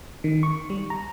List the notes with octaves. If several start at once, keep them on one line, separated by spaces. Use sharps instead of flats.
D#3
C#6
G3
A#5